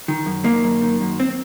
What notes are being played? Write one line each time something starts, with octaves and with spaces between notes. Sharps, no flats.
D#3
F#2
D#3 A#3
F#2
D#3
F#2
C4